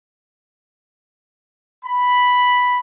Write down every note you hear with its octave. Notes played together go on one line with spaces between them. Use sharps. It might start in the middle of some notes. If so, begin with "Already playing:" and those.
B5